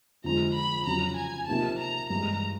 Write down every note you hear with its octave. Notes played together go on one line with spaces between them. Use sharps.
F2 D3 F3 G#3 A#5
B5
F2 C#3 F#3 A#5
G#5
C3 F3 A#3 D#4 G4 A5
A#5
G2 E3 G#3 A#5